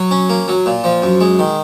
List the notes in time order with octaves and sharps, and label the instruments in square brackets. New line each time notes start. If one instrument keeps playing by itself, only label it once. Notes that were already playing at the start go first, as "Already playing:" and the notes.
Already playing: [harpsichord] F#3
C#4
A#3
F#3
A#2
F3
F#2
G#3
D#3